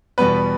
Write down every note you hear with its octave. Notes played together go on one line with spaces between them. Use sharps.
E2 B2 G3 B3 B4